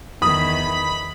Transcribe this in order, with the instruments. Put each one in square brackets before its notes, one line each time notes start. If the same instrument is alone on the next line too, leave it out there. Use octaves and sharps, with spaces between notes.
[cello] E2 D#3 [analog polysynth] B5 [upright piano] D#6